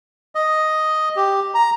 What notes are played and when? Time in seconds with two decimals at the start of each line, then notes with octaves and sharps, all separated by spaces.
0.35 D#5
1.16 G4
1.54 A#5